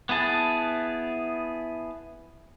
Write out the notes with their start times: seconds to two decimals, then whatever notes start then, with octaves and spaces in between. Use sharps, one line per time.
0.09 B3 E4 G#4 A5